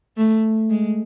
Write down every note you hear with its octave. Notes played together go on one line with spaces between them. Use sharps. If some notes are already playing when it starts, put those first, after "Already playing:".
A3
G#3